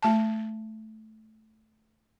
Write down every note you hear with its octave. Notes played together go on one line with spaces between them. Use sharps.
A3 A5